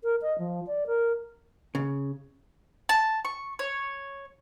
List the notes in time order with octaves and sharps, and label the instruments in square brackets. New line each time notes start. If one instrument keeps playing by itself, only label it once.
[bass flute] A#4
D#5
F3
D5
A#4
[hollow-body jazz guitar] C#3
[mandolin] A5
C#6
C#5